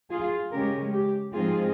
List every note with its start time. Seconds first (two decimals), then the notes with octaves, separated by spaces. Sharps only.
0.10 F4 G#4
0.51 C#3 G#3 C#4 G4 A#4
0.92 G4
1.33 G#2 F3 G#3 C4 D#4 F4 G#4